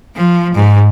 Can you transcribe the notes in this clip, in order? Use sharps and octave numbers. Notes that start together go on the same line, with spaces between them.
F3
G#2